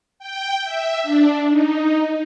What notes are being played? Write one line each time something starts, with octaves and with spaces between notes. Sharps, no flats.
G5
E5
D4
D#4